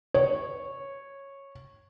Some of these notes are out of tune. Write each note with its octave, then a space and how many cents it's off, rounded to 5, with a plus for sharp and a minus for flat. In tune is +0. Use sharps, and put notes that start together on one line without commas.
C#5 -10